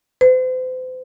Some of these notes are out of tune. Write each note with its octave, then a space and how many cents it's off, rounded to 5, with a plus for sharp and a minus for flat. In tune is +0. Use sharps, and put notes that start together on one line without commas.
C5 -40